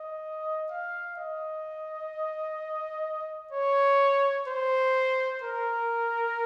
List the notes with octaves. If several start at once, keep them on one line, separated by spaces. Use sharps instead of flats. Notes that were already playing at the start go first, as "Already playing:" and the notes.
Already playing: D#5
F5
D#5
C#5
C5
A#4